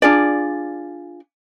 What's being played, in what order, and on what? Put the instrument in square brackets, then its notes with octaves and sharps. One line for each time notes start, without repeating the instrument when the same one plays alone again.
[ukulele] D4 F4 G#4 D5